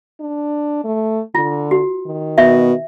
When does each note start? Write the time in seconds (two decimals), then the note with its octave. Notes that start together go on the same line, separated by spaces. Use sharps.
0.21 D4
0.84 A3
1.35 D3 F4
1.71 F#4
2.07 D#3
2.38 B2 E5